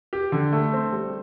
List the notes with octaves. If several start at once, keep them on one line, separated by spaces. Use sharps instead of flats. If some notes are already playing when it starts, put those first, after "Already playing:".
G4
D3
A3
C4
G3